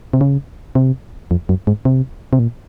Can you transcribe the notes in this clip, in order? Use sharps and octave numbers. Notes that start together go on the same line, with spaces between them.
C3
C#3
C3
F2
F#2
G#2
C3
C3
A#2